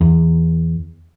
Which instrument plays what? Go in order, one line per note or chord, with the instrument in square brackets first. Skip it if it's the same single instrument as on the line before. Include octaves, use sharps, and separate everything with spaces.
[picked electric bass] E2